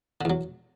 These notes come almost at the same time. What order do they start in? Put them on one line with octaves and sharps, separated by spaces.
D3 E2 F#3